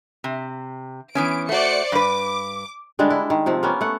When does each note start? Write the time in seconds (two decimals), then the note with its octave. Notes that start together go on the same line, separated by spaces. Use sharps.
0.24 C3
1.15 E3 B3 C#4 D7
1.49 A3 F#4 C5 D5 C#7
1.92 G2 B4 D6
2.99 D3 G3 G#3 D4
3.10 E4
3.30 D#3
3.46 C3 F3 C4
3.63 A#3 B3 C#4
3.81 A3 F#5